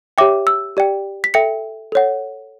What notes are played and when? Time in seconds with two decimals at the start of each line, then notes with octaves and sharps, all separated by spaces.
0.18 G4 C#5 E5 G5 D6
0.47 E6
0.77 G4 D5 G5
1.24 B6
1.34 A4 E5 G5 C#7
1.92 A4 C#5 F#5